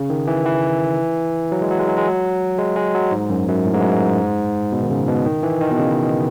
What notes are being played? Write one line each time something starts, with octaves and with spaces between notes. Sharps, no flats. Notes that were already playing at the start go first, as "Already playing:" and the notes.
Already playing: C#3
D#3
E3
E3
F#3
G#3
F#3
G#3
F#3
G#3
F#3
G#3
G#3
F#3
G#2
F#2
F#2
A2
G#2
F#2
G#2
B2
D#3
C#3
B2
D#3
E3
D#3
B2
C#3